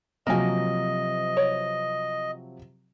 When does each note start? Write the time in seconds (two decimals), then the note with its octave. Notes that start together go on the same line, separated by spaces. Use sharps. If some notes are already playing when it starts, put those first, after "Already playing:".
0.27 C3 F3 F#3 A#3 D#5 G#5
1.37 C#5